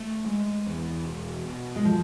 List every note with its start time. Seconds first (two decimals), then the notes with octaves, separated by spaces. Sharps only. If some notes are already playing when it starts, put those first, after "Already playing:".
Already playing: A3
0.26 G#3
0.66 E2
1.05 E1
1.45 B2
1.76 G#3
1.85 F3